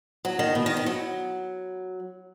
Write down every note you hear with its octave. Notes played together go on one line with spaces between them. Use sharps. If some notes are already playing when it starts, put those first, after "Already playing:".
F#3
D#3
B2
D#3
D#3
F#3